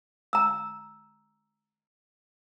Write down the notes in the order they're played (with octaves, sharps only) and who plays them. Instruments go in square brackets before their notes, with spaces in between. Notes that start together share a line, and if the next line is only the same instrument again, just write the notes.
[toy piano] A#5 E6